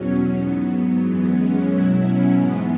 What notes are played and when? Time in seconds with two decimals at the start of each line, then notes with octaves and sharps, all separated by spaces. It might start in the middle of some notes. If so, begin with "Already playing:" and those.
Already playing: E2 B2 F#3 C#4
0.34 G#2 F#3 B3
0.67 B3
1.01 F#2 E3 G#3
1.33 C#4
1.66 B2 F#3 E4
2.00 C#4
2.32 G#2 E3 G#3 B3